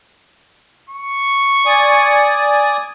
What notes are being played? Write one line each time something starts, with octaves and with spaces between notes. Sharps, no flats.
C#6
D5 G#5 D#6